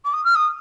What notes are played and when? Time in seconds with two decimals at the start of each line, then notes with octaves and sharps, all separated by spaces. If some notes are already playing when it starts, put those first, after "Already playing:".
0.04 D6
0.13 D#6
0.24 F6
0.35 D#6